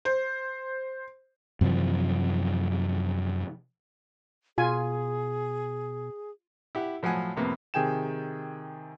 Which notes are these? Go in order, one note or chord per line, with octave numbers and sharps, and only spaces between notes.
C5
F#2 C3 E3 F3
B2 F4 G#4 G#5
E4 G4 F#5
A2 F3 F#3 F#5 G#5
F2 A2 C3 A#3 B3
C3 D#3 G#4 G5 G#5 E7